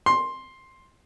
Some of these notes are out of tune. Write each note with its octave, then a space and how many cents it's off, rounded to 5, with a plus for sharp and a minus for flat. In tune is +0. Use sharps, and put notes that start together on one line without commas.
C6 +10